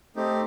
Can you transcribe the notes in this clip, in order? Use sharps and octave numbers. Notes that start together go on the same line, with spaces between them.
A3 C4 D#4 G4